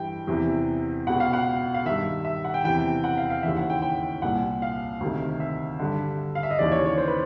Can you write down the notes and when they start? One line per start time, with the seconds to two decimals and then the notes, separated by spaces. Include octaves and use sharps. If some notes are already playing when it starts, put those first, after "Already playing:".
Already playing: G2 E3 G5
0.27 E2 C3 E3
1.07 C#2 B2 F#5
1.20 F5
1.33 F#5
1.74 F5
1.85 G2 D#3 E5
2.25 E5
2.44 F#5
2.54 G5
2.64 E2 C3 E3 G5
3.04 F#5
3.18 F5
3.30 F5
3.43 D#2 C#3 E3 E5
3.57 F#5
3.70 G5
3.82 G5
4.22 C2 A#2 F#5
4.62 F5
5.00 D2 C3 D#3
5.40 E5
5.79 G2 D3
6.35 F5
6.43 E5
6.51 D#5
6.59 D#2 C#3 E3 D5
6.72 C#5
6.85 C#5
6.97 C5
7.07 B4